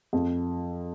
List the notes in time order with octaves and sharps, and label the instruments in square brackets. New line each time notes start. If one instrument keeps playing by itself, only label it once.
[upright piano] F2